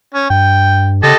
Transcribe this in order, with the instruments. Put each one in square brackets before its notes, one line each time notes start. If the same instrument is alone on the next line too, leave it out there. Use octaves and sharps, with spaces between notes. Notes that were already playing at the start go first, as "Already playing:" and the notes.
[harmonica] C#4
[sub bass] G2 [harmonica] G5
[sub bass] C#3 [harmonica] G4 A4 D#5